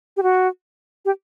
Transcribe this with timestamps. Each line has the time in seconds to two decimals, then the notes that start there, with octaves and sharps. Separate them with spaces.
0.17 G4
0.23 F#4
1.05 G4